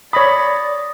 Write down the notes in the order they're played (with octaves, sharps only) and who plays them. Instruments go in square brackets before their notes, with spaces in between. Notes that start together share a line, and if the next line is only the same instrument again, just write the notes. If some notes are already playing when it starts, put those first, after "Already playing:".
[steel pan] C#5 B5 [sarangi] D5 [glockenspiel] D#6 A#6